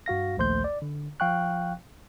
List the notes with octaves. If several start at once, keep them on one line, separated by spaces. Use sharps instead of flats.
G2 F#4 F5 A#6
A#1 D#2 A3 C5 C6 G6
D5
D3
F3 F5 G5 C#6 F#6